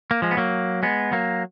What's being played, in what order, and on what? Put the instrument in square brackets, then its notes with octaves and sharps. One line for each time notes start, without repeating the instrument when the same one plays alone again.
[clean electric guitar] A#3
F3 G#3
B3
F#3 A#3
G#3 B3
F#3 A#3